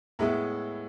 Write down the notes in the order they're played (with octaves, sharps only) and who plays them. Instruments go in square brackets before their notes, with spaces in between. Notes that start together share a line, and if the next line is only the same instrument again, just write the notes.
[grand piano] A2 G#3 B3 E5